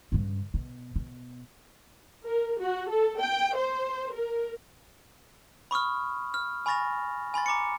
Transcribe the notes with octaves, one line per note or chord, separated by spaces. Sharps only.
G2 C#3
B2
B2
A#4
F#4
A4
G5
C5
A#4
B5 C#6 D#6 F6
F6
G#5 B5 C#6 A6 A#6 F7
G#5 B5 C6 A6
A#5 D6 A6 C#7